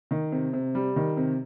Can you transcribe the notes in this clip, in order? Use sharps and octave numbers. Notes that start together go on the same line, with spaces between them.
D#3
C3
C3
G3
D#3
C3